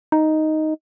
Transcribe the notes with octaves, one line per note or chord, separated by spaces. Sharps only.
D#4